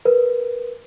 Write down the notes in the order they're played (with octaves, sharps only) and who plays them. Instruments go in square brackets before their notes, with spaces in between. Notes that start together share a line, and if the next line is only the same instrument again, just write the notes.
[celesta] A#4 B4